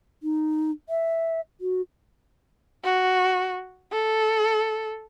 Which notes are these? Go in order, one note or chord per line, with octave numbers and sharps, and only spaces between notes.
D#4
E5
F#4
F#4
A4